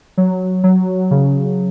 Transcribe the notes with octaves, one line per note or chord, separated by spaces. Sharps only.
F#3
F#3
C#3